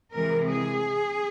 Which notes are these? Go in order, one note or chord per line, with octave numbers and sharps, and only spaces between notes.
C3 E3 G#3 A#4
G#4